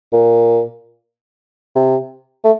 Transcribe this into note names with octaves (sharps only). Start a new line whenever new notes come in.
A#2
C3
A3